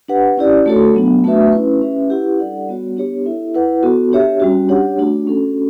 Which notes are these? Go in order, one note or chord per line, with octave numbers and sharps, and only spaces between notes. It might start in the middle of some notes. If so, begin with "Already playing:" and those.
D4 G4 B4 F#5
C#4 E4 G4 D5
A3 D4 F#4 A4 C#5
F#3 B3 D4
A3 D4 F#4 B4 E5
C#4 E4 B4
C#4 G4 B4 E5
E4 G4 B4 F#5
G3 D4 A4 D5 F#5
G3 B3 F#4 C#5
B3 D4 G4 C#5
E4 A4 E5
E4 B4 F#5
B3 F#4 A4
D4 G4 C#5 E5
G3 C#4 F#4
D4 G4 C#5 F#5
A3 D4 F#4
C#4 F#4 A4